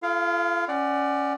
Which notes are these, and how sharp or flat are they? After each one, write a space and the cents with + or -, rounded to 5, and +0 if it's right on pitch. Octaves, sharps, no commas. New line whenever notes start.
F4 -45 A4 -25 F5 +0
C#4 +5 D5 +10 F#5 +30